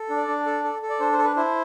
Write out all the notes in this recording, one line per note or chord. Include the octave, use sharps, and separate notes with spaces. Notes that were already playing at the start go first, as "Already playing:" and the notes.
Already playing: A4
D4
D5
D4
A4
A4
A4
D5
D4 C5
C5
A4
B4
E4 C5